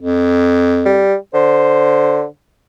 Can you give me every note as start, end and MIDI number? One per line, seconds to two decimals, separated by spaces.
0.01 1.06 41
0.86 1.16 55
1.34 2.26 50
1.34 2.24 72